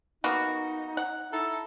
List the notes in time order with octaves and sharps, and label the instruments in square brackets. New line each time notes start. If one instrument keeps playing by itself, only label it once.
[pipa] A#3 B3 F#4 [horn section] D#4
[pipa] F#5
[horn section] D#4 E4 A4